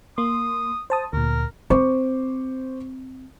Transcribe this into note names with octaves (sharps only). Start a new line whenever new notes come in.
A#3 C6 D#6
C5 A5 D#6
D2 A#2 A#4
C4 C5 C#6 D6